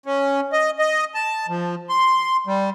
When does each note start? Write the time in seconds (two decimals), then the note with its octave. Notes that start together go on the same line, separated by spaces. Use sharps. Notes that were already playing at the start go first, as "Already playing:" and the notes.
0.06 C#4
0.53 D#5
0.79 D#5
1.15 A5
1.48 F3
1.89 C6
2.47 G3